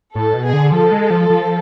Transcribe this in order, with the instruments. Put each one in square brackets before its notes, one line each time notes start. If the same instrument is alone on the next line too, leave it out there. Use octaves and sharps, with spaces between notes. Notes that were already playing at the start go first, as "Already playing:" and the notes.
[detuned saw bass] A2 [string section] A4
[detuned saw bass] B2
[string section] G#4
[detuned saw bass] D3
[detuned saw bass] F3 [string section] A4
[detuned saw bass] G#3
F3
F3